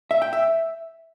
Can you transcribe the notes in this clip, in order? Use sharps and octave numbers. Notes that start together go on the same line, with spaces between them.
E5
G5
E5